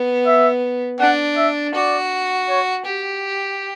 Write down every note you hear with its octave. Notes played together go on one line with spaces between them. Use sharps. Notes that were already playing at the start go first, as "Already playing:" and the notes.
Already playing: B3
E5
D4 F#5
E5
F#4 D5
C#5
G4